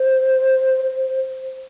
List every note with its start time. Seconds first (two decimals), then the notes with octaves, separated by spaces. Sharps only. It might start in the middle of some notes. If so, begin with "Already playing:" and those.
Already playing: C5
0.85 C5